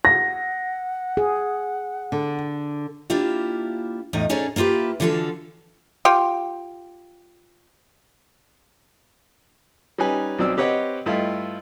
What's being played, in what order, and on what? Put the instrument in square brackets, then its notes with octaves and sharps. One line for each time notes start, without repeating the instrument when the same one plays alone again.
[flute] F#5 [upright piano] A#6
[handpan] G#4
[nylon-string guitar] D3
[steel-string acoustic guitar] A#3 D4 E4 F4 G4
E2 A2 D#4 F4 D#5
C#4 D#4 G#4 A4 C#5 D5
A#3 E4 F4 G4 B4
D3 E3 F3 F4 F#4 A4
[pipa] F4 G4
[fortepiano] G3 C#4 D#4 B4 G#5
B1 F#3 C4 D5 D6 E6
C4 G4 B4 C#5 D#5 F#5
G2 A3 E4 F4 D#5